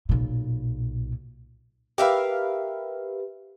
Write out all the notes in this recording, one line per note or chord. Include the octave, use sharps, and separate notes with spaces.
B1 A#2
G4 A#4 B4 E5 F5